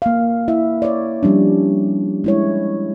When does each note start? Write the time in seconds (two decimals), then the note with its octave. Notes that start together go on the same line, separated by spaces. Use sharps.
0.02 A#3 F5
0.48 E4 E5
0.82 C#5 D5
1.23 F3 G3 C#4 D4
2.24 G#3 E4 C#5